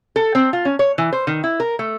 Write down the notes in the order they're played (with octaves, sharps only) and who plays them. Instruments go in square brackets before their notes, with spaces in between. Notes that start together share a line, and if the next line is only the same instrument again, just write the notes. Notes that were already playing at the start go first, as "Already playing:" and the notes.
[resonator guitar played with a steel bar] A4
C4
F4
C#4
C#5
E3
C5
D#3
E4
A#4
A3